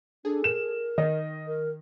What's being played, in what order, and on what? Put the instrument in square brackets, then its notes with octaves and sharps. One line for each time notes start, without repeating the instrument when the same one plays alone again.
[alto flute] D4 [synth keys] G#4 A4
[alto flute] A#4 [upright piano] E7
[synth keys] D#3 [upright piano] D#5
[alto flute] A#4